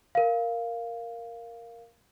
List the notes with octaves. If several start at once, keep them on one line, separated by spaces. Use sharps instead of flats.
A#4 F5